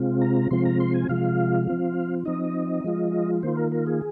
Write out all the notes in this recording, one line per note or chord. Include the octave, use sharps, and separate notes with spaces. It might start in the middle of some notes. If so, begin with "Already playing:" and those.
Already playing: C3 G#3 C4 F4
A#5
C3 F3 G#3 C4 F4 C6
A#5
C6
G#5
C3 F3 G#3 F4 F5
F3 C4 F4
F3 C4 D#4 D#5
F3 G#3 F4
D#3 A#3 F4 C5
A#4
A#4
G#4